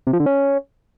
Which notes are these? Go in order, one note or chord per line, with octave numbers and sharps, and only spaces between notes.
C3
F3
D3
C#4